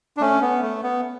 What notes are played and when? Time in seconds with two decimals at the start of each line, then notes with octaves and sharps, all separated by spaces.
0.17 D4
0.21 A3 C#4
0.42 B3
0.62 A3
0.83 B3